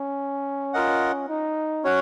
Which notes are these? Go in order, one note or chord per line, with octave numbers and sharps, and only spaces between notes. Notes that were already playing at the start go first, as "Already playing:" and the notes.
Already playing: C#4
F4 A#4 D#5 F#5
D#4
C#4 F#4 C#5 F#5